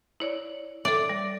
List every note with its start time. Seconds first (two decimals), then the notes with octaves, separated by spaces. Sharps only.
0.20 E4 C#5 D5
0.85 A4 D5 E5
1.09 G3